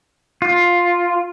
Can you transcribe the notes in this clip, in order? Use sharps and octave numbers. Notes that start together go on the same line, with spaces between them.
F4